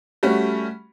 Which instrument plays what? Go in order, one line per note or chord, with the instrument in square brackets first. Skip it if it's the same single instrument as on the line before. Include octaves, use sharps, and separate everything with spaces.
[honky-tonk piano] G3 A3 C#4 F#4